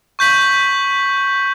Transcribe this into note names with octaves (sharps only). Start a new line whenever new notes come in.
C#6 G6 B6 F#7